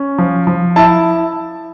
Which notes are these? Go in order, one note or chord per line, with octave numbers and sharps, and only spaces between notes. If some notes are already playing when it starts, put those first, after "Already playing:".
Already playing: C#4
F3
F3
E4 A5